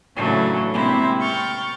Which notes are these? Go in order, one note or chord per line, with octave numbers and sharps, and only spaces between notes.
A2 C#3 E3 F#3 A3 D4
C3 G#3 A#3 C4 E4 G4
G5 C#6 F6 G6 A6